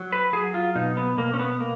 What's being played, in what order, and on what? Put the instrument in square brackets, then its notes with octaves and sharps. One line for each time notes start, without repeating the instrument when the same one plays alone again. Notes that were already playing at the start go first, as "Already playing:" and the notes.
Already playing: [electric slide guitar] F#3
B4
F#3 G#4
F4
B2 D#4
B3
B2 A#3
C#4
B3
A#3